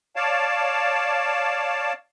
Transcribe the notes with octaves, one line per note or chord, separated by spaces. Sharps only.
C#5 D5 F5 A5